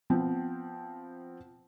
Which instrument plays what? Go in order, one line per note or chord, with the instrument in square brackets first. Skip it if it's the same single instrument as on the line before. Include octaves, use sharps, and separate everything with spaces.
[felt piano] F3 B3 C4